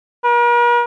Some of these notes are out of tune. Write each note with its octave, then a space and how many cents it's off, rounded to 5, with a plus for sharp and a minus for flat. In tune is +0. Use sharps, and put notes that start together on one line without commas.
A#4 +45